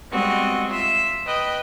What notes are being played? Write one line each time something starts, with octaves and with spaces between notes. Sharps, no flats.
G3 G#3 B3 C4 F#4 D#5
F4 E5
B4 D#5 G5 B5